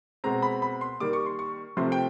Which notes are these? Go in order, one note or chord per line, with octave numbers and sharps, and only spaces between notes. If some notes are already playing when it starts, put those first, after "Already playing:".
B2 G#3 C4 A#5
B5
B5
C6
D#3 G3 A#3 D6
C#6
C6
C#6
C3 F3 A3 C4 C6
G5